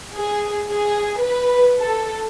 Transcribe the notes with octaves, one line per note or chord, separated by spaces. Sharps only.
G#4
G#4
B4
A4